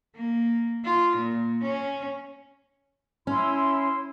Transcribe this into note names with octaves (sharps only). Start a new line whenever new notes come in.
A#3
F4
A#2
C#4
C#4 E4 C6